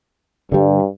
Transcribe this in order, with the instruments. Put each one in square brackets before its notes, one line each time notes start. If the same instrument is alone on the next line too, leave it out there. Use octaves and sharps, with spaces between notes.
[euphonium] G2 [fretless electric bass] D3 G3